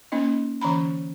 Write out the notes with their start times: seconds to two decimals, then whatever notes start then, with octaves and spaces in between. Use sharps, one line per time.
0.12 A#3 C#4 D#4 D#5
0.61 D3 E3 C#4 A#5 B5